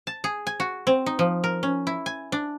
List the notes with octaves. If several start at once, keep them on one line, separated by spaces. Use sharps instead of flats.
A5
G#4
G#5
F#4
C4
D#4
F3
A#4
C#4
E4
G#5
D4